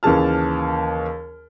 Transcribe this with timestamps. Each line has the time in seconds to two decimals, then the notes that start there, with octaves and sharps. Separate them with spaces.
0.03 D#2 C#3 E3 G#4 A5 F6